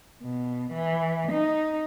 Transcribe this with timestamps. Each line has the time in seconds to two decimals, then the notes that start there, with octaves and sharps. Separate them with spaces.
0.23 B2
0.72 E3
1.32 D#4